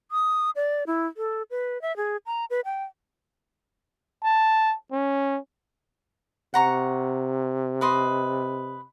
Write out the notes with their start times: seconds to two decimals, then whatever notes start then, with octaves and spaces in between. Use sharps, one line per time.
0.11 D#6
0.56 D5
0.87 E4
1.17 A4
1.51 B4
1.82 E5
1.97 G#4
2.26 A#5
2.50 B4
2.65 G5
4.24 A5
4.92 C#4
6.54 C3 F#5 A#5 C#6
7.81 B4 D#5 C6